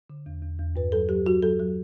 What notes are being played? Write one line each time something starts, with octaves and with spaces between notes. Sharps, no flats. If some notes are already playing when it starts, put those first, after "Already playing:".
D3
E2
E2
E2
G2 B4
F#3 A4
F#3 G4
F#3 F#4
F#3 A4
F#3